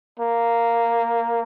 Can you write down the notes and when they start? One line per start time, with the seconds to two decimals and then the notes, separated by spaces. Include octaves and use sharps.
0.20 A#3